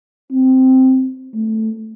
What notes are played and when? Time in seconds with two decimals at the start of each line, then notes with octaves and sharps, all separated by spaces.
0.32 C4
1.35 A3